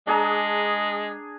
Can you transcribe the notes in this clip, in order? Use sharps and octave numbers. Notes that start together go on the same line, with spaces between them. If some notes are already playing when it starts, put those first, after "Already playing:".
G#3 D4 G#4 A#5